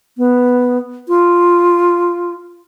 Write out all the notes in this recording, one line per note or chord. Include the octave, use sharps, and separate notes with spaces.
B3
F4